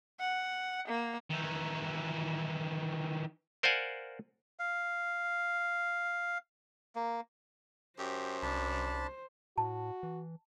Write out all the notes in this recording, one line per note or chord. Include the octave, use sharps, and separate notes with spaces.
F#5
A#3
D#3 E3
A#4 C5 D5 F5 F#5 G#5
F5
A#3
F#2 G4 C5
C2 D4 A5 B5
A2 F#4 A5
E3